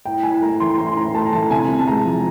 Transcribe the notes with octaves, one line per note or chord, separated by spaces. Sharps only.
A2 G5
A2 G#5
A3 A#5
E3 C6
A2 C6
A2 A#5
A3 A5
A#5
E3 A5
C3 G#5
C3
A5
G#3 A#5
F3